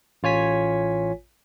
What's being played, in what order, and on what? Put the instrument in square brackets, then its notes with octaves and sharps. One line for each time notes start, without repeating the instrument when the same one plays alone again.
[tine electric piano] A1 F4 C#5 G#5 B6